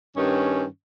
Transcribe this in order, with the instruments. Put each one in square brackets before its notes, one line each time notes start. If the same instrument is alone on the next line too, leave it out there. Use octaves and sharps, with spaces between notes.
[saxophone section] G2 D#3 C#4